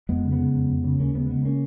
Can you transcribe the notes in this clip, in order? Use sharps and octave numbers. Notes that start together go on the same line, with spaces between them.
F2 G#3 B3
C#3
G#3 B3
C#3
F2
F2
C#3
D#2 A#3 C#4
C#3 G#3 B3
C#3 G#3 B3
A#3 C#4